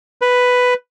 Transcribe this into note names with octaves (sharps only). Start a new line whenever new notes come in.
B4